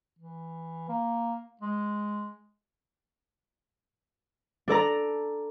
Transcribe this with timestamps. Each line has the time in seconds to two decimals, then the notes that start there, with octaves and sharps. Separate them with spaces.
0.19 E3
0.88 A#3
1.61 G#3
4.68 D4 A4 D5 A#5